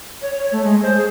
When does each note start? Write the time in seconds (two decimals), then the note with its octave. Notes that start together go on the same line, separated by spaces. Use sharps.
0.22 C#5
0.36 C#5
0.52 A3
0.64 G#3
0.83 C5
0.97 G#4